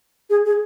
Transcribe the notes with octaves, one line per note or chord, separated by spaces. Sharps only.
G#4
G#4